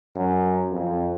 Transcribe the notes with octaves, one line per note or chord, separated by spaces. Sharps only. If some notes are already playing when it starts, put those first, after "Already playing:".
F#2
F2